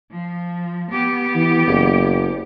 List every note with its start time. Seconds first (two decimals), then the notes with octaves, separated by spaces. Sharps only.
0.11 F3
0.91 B3 G4
1.35 E3
1.67 F#1